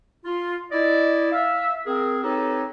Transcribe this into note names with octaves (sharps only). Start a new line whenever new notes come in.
F4
E4 D5 D#5
E5 F5
C4 G#4 A#4
C4 D#4 G4 A4 B4 C#5